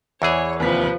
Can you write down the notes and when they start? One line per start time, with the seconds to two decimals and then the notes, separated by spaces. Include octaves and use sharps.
0.22 E2 E3 G#4 C#5
0.60 D#2 C3 F3 B4 B6